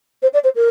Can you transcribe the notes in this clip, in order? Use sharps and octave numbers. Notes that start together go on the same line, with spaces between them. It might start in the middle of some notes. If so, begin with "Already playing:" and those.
C5
D5
C5
A#4